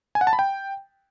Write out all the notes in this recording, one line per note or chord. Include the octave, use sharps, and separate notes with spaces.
G#5
F#5
A5
B5
G5